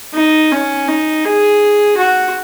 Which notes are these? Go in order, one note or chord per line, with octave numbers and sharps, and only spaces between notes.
D#4
C#4
D#4
G#4
F#4